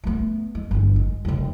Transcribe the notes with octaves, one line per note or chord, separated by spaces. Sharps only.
A3 B3
G#3
G1 E3
G#3
F1 F2